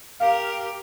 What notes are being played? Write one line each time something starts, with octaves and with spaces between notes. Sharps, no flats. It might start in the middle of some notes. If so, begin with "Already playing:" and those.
G4 A#4 F5